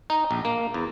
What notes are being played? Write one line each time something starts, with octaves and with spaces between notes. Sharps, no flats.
D#4
A#1
A#3
E2